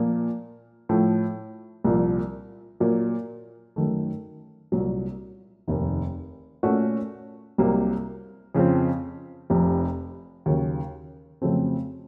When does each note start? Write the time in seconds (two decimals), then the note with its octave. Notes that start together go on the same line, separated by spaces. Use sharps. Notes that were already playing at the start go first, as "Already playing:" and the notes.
Already playing: A#2 F3 A#3
0.89 A2 F3 A3
1.84 C2 A#2 F3
2.80 A#2 F#3 A#3
3.76 F#2 D#3 A3
4.72 C2 A#2 F#3
5.68 F1 D#2 D#3
6.63 A#2 A3 C#4 F#4
7.58 C2 C3 F#3 A#3
8.55 F2 C#3 F3 C4
9.50 F1 F2 C3
10.46 D#2 C#3 F#3
11.42 F2 C#3 F#3 A3 C4